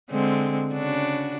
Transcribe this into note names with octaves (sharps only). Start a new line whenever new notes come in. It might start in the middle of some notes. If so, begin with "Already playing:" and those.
D3 G#3 C4
C#3 D4 F#4